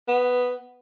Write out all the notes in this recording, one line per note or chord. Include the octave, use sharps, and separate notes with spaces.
B3